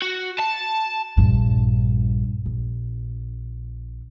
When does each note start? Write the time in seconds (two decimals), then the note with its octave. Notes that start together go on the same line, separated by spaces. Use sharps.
0.02 F#4
0.38 A5
1.17 A#1 G2
2.46 A#1